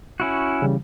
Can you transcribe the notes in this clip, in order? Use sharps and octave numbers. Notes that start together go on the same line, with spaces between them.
C#4 E4 F#4
C#3 E3 G3